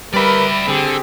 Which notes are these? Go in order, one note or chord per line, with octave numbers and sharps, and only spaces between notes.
G3 A#4 B4 D5 E5 B5
D3 C4 G4 G#4